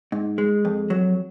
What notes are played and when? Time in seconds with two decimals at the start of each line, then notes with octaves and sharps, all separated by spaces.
0.12 G#2
0.38 G#3
0.65 F2
0.90 F#3